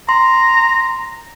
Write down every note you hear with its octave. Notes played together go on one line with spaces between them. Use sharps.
A#5 C6